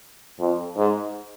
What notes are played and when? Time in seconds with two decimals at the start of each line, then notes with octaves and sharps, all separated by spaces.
0.39 F2
0.77 G#2